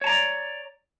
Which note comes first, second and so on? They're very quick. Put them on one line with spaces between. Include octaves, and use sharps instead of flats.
C#5 A5 A#5 D5